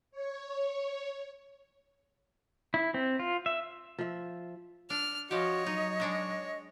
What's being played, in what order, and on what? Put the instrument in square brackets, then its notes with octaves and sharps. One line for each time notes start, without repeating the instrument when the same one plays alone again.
[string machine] C#5
[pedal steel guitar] E4
C4
F4
E5
[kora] F3 E5
[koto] D4 [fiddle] F6
[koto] F3 G4 [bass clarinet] F#4 [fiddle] C#5 [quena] D#5
[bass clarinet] F#3 [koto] D#4
[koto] G#3 D4 F#4